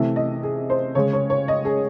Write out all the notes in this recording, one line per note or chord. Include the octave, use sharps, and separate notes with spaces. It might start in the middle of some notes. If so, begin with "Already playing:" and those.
Already playing: C3 E3 A3 E5
D#5
G#4
C5
C#3 G#3 C#5
C#5
C#5
D#5
G#4